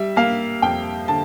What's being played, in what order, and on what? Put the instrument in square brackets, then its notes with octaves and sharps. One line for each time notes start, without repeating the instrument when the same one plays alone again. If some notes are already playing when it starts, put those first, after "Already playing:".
Already playing: [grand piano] G3 E5
A#3 F5
F2 G5
D3 A5